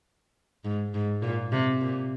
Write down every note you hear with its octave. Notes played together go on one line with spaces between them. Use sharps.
G#2
G#2
A#2
C3
A#2